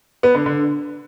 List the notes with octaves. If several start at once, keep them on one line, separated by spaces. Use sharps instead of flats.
B3
D3
D3